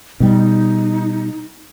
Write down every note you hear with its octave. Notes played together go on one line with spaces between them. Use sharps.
B2 G3 D#4